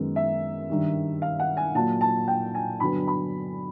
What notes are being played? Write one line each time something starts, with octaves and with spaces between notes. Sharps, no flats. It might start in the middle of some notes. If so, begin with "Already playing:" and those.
Already playing: F#2 D#3 G#3 B3
E5
G2 D#3 G3
F5
F#5
G#5
A#2 F#3 A#3 A5
A5
G5
G#5
G2 D3 F#3 B3 B5
B5